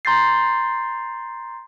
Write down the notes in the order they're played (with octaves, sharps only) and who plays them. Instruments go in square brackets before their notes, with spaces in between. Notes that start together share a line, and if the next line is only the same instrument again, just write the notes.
[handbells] A#5 C6 G6 A6 C7